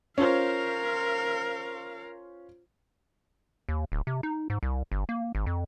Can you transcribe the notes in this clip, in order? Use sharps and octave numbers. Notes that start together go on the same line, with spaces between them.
C#4 F4 A#4 C5 F5
D#2
D1
C3
D#4
G#2
C2
G1
A#3
G#1
F2